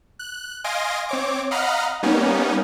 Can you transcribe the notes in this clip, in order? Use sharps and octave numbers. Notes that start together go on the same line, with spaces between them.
F#6
D#5 F5 G#5 C6 A#6 D7
C4 C#5 D6
D#5 F5 F#5 A#5 B5 F6
G3 A#3 B3 C#4 D#4